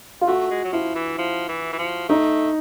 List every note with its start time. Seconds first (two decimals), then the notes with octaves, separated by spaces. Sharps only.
0.21 F4
0.27 A3 F#4
0.51 G#3
0.64 F#3
0.73 F3 E4
0.95 E3
1.18 F3
1.48 E3
1.73 E3
1.79 F3
2.09 A3 D#4